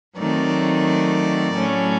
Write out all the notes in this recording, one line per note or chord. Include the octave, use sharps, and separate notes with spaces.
D#3 F#3 A3 C4 D5
A2 F#3 A3 C#4